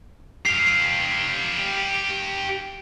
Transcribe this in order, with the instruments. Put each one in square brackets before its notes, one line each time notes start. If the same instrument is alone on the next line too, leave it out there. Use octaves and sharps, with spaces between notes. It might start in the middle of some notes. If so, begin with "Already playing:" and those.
[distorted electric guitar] G4 F5 [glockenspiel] C7